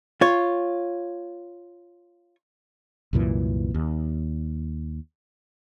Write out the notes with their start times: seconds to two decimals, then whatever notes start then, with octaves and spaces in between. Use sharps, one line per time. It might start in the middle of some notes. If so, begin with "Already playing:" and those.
0.21 F4 C#5
3.13 C2 F#2 A#2 E3
3.74 D#2